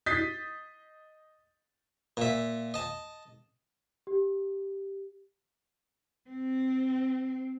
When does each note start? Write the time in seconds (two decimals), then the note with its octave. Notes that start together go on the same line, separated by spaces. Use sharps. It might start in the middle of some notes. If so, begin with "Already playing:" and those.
0.06 D#5 D#6 G6 A6 B6 C7
2.17 A#2 E5
2.74 D#5 A5
4.07 G4
6.30 C4